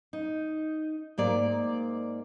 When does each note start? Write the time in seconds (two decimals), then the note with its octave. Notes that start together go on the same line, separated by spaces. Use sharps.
0.13 D#4
1.18 G#2 A#3 D5